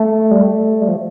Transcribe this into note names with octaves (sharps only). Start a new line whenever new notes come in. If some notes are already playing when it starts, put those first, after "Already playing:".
Already playing: A3
G3
A3
G3
F3